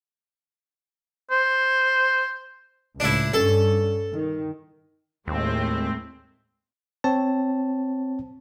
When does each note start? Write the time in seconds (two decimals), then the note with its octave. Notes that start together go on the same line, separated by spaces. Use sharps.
1.31 C5
3.00 C#2 A2 D4 E4
3.34 G2 C#4 A4
4.14 D#3
5.28 D#2 A2 G#3 C4
7.04 C4 C#5 A5